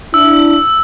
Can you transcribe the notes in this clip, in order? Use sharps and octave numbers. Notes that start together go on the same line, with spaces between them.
D4 E4 E6